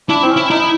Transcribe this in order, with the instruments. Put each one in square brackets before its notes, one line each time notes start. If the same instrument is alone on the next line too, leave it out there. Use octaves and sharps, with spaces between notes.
[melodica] D4 [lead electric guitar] E4
[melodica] C4
C#4
[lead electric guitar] E4
[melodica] D#4 [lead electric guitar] E4